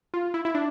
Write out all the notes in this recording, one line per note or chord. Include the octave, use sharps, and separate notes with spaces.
F4
E4
E4
D4